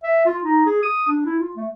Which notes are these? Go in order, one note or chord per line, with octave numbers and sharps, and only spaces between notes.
E5
F4
D#4
G#4
D#6
D4
E4
F4
A3